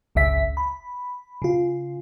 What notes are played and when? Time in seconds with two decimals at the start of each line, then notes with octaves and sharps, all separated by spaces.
0.15 G1 C#2 C#3 E5 B6
0.57 B5
1.42 C#3 F4